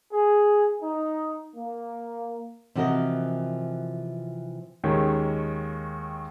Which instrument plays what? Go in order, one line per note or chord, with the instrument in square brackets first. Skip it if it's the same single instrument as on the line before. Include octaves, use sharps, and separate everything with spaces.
[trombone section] G#4
D#4
A#3
[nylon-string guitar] C3 E3 F3 F#4 A#4 D#5
[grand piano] D#2 D#3 G#3 C#4